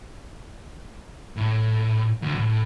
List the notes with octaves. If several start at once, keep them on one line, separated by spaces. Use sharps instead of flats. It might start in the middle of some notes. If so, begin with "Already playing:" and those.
A2
D2
A2